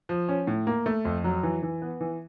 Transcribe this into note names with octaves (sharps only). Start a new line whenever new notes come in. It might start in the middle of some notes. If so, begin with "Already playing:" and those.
F3
C#4
A2
A#3
A3
F2
F#3
E3
E3
B3
E3